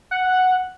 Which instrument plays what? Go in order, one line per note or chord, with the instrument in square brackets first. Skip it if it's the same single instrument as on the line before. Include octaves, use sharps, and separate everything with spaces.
[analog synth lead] F#5